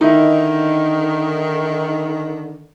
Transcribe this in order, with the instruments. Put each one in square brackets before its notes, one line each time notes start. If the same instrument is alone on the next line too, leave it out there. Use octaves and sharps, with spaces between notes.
[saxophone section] D3 D#3 [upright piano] D#4 E4